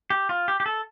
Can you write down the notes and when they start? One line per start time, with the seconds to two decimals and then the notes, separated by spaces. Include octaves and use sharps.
0.10 G4
0.29 F4
0.48 G4
0.60 G4
0.66 A4